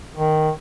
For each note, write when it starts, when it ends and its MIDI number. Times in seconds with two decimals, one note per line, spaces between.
0.16 0.50 51